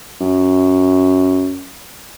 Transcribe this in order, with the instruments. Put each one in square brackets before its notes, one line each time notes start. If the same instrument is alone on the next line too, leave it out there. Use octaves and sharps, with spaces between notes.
[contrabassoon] F#2